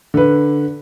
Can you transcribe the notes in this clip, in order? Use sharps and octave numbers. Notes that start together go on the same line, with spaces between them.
D3 B4